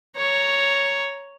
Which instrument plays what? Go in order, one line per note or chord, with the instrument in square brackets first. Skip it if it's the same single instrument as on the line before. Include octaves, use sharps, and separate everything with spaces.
[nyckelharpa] C#5 A#5